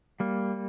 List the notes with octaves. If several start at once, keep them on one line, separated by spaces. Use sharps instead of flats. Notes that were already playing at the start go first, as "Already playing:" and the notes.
G3 A#3